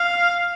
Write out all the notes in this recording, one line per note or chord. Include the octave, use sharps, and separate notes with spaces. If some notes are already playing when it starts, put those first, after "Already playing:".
Already playing: F5